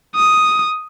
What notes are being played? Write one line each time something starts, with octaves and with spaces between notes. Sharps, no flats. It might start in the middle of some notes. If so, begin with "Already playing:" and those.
D#6